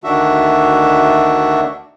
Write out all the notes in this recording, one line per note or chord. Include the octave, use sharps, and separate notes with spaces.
D2 D#3 D4 F#4 E5